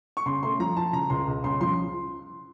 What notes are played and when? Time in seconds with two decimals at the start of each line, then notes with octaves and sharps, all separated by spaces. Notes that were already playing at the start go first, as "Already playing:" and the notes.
0.17 C#6
0.26 C#3 C6
0.43 A3 C6
0.60 F3 A#5
0.77 F3 A5
0.93 C#3 A#5
1.10 C#2 C6
1.27 C#2
1.44 C#3 C6
1.61 F3 C6